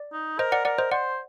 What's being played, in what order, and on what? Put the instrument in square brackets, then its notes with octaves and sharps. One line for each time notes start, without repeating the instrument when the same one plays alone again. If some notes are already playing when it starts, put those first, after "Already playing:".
Already playing: [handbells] D5
[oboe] D#4
[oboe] A#4 [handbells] C5 D#5
[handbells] D5 F#5
[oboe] A#4 [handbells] D5 F#5
[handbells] C5 D#5
[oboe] C5 [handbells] D5 F#5